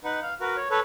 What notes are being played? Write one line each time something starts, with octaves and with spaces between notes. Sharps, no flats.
D#4 B4 F#5
F5
F#4 A#4 B4
C#5
A4 B4 C#5